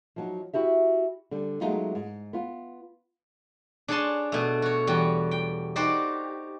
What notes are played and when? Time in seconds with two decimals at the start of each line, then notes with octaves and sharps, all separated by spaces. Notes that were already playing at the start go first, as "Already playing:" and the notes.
0.16 F3 F#3 D#4
0.53 E4 F#4 G4 E5
1.31 D3 G3
1.61 F#3 G#3 A3 B3 D#4 F4
1.95 G#2
2.33 B3 F4
3.88 D4 G#4 C#5 G#5 A5 C6
4.32 B2 A3
4.62 F#4 C#5
4.87 E2 G3 F#4 G5
5.31 G5
5.76 D#4 F#4 G4 C5 D5